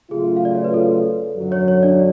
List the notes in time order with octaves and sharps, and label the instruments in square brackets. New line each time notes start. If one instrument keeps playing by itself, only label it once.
[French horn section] C#3 F#3 A3 F4 [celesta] G#4
[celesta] F5
D5
C#5
B4
A4
[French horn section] F#2 D3 F#3
[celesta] C#5
C#5
D4 D5